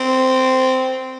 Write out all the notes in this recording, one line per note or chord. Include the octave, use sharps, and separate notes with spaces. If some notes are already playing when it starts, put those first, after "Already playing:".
Already playing: C4